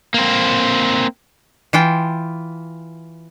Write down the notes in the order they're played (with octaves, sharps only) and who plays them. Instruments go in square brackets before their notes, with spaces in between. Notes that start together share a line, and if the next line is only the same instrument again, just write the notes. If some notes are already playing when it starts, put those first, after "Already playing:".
[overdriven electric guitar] A#3 C4
[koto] E3 F4 G5